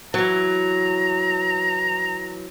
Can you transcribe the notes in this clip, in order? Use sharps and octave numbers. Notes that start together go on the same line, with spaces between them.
E3 F#3 A#5